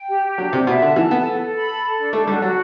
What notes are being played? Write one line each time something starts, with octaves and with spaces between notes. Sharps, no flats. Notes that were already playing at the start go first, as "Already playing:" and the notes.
Already playing: G5
G4
G4
F#3 D4
C3 D4
B2 E5
D3 A5
E3 A5
B3 A4
A4
A4
B5
A4
A4
D4
A3 A4
G3 F#4
F#3 F#4